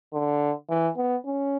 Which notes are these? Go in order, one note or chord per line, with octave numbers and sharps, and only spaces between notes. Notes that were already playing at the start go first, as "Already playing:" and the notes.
D3
E3
B3
C#4